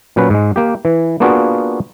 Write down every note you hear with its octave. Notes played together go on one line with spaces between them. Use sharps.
A#2 F#3 C#4 B4
G#2 G#3
A#3 G4
E3
A#3 B3 D4 F4 F#4 G#4